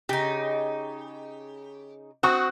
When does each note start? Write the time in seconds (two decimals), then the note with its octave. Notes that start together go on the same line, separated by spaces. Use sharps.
0.09 C#3 D#4 G4
2.23 C4 F#4 C#6 D#6 F#6